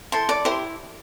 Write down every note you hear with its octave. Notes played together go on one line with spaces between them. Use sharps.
E4 A4 C5 C6
D5 D6
E4 G4 C5 C6